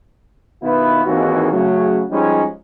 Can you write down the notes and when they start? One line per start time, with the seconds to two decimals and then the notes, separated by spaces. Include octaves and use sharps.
0.62 B2 D#3 B3 E4 F4 B4
1.05 G#1 D#2 E3 G#3 A#3 F#4
1.51 C#3 F#3 A3
2.11 F3 G3 G#3 C#4 D#4